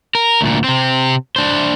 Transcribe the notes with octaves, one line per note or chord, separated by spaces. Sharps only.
A#4
D2 A#2
C3 C4
D4 C5